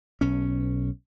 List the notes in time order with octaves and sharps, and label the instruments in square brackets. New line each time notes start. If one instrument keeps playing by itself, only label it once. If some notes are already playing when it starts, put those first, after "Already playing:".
[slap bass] B1 C#4